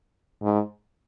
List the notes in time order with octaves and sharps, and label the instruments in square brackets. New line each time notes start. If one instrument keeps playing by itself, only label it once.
[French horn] G#2